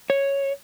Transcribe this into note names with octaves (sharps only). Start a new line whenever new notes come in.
C#5